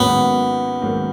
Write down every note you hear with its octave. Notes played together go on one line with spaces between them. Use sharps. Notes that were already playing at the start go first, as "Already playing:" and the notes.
Already playing: G#2 D#3 F#3 A#3 B3 C#4
G#2 D#3 F#3 A#3 C#4